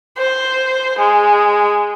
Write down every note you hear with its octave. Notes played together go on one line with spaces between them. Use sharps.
C5
G#3